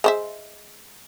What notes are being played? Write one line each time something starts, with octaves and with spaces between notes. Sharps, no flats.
G#3 C5 E5